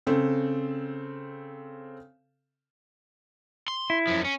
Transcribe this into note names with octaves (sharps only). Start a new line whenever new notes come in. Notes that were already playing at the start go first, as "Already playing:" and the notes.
C#3 C4 A4
C6
E4
F#2 F3
C#4